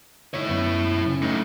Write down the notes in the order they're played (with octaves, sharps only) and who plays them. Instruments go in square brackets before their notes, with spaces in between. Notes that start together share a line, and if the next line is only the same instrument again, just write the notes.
[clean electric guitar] D3 D#3 G#3 [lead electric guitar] E4 C#5
[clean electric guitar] F#2 B3
C#3 C#4
[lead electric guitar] A3 D#4